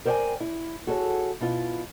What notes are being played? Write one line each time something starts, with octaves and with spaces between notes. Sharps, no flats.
A#4 C5 D5 F5 G5 G#5
E4
F#4 G#4 A4 C#5
B2 E4 F4